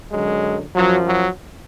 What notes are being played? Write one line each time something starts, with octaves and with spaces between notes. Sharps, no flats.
F#2 D3 F#3 G#3
F#2 F3 F#3
F#3